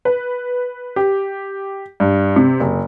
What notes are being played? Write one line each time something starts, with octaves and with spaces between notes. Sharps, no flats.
B4
G4
G2
C3
F#1